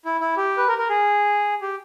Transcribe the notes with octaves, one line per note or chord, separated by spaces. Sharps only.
E4
E4
G4
B4
A#4
A#4
G#4
G4